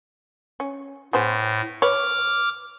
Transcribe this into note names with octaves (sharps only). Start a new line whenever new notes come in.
C#4
A2 B3 G#4 C5
B4 C#5 D6 F6